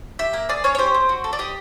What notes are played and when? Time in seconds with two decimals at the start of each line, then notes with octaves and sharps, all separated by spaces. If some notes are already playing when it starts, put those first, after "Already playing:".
0.19 G4 E5
0.33 A#3
0.49 G#4 D5
0.64 C#4 C#5
0.75 C#5
0.78 G4 C5
0.94 C4
1.09 F#4
1.24 A4
1.33 D5
1.39 G4 D#5